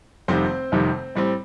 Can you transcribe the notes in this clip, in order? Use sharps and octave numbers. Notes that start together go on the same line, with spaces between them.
F1 F2 C3 D#3 G3 C4 C5
F1 F2 C3 D#3 G3
A2 G3 C4